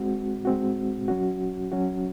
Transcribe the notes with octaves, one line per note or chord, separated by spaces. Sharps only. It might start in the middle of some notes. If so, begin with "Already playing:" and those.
Already playing: G#3 C4 F#4
G#3 C4 F#4
F#3 C#4 F#4
F#3 C#4 F#4